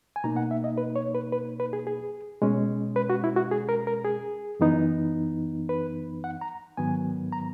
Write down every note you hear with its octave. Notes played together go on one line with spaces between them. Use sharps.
G#5
B2 A#3 D#4 A#5
F#5
E5
D#5
B4
C#5
B4
B4
B4
G#4
G#4
B2 G#3 C#4
B4
F#4
E4
F#4
G#4
A#4
A#4
G#4
F#2 E3 B3 D#4
B4
F#5
A#5
G#2 D#3 F#3 B3 G#5
A#5